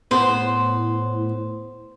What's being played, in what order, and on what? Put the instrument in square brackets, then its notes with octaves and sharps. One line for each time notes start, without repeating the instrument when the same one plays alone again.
[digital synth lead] A2 [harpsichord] B3 [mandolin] C5